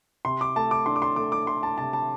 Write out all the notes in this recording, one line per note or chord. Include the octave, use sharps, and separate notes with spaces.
C3 C6
D6
A3 A5
D6
D4 C6
D6
C6
A3 D6
D6
A3 C6
A5
C3 A5
A5